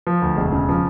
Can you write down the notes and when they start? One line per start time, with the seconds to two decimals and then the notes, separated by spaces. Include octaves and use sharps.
0.07 F3
0.22 D2
0.37 E1
0.52 C#3
0.69 F3